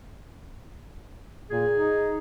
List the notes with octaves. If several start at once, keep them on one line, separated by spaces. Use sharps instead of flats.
A#2 G#4
D#4